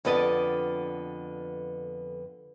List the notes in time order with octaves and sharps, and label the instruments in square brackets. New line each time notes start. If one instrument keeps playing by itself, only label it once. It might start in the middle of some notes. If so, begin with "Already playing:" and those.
[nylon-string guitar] F2 D3 B3 D5 D#5